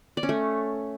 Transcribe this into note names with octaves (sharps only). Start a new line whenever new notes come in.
D5
C#4
A3